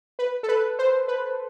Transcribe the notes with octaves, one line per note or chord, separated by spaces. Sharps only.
B4
A4
B4
C5
B4